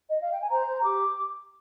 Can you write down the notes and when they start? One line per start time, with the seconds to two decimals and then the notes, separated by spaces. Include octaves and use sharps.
0.09 D#5
0.20 F5
0.30 G5
0.40 G#5
0.49 C5 A#5
0.68 C5
0.84 G4 D6